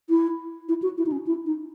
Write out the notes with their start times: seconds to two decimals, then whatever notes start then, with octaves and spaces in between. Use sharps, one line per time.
0.09 E4
0.69 E4
0.82 F#4
0.97 E4
1.06 D#4
1.12 C#4
1.27 E4
1.46 D#4